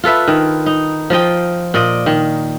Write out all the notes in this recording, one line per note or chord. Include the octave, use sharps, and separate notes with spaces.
F4 A4 B4 E5
D#3
D#4
F3 F4 D#5 G5
A#2 D5 D#5
D#3